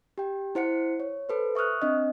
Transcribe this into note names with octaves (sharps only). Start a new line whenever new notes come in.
G4 G5
E4 C5 F#5 C#7
C#5
A4 B4 C5
E5 C#6 D#6 F6 F#6
C4 D4 D#5